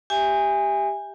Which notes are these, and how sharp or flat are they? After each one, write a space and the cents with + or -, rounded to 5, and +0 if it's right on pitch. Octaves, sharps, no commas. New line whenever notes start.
G4 +0 E5 +0 G#5 -20